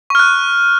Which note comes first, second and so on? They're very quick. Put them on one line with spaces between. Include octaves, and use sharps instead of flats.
C#6 F6 F#6